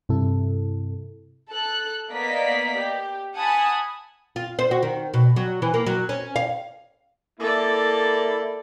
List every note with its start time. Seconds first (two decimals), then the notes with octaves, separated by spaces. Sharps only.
0.09 G2 C3 E4 A4
1.50 A4 F#6
2.11 A#3 B3 A#4 D5 D#5 B6
2.78 G4
3.37 F#5 G#5 A5 B5 D#6
4.36 F4
4.59 C5
4.71 F#4
4.83 D#3
5.14 B2
5.36 F#3
5.62 E3
5.74 A#3
5.86 F#3
6.09 C#4
6.36 F5
7.40 A#3 E4 A4 D5